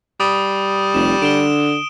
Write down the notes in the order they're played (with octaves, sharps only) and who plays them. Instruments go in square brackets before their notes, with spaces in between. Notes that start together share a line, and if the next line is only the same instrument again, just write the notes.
[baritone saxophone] G3 [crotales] D#6
[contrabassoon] F1 [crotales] E7
[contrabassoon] D3 [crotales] D7 E7 G7